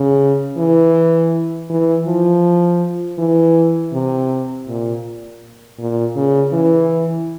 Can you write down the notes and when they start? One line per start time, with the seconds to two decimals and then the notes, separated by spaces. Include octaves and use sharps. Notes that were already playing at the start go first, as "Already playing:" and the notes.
Already playing: C#3
0.57 E3
1.70 E3
2.06 F3
3.18 E3
3.93 C3
4.67 A#2
5.79 A#2
6.16 C#3
6.52 E3